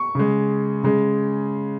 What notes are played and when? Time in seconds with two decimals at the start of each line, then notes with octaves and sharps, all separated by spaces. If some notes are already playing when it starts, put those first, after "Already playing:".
Already playing: C#6
0.15 C#3 G#3
0.84 C#3 G#3